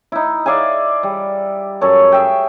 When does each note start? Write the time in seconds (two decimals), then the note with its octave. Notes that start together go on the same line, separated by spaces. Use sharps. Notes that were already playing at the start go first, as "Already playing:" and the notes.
0.12 D#4 E4
0.46 D5 E5 F5 G#5
1.03 G3
1.81 F#2 A4 C#5
2.12 G#4 E5 G5